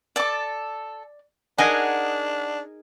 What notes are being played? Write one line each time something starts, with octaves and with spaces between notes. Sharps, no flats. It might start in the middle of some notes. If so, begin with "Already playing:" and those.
A4 D5 A5 D6
D4 D#4 G#4 A#4 F#5 G#5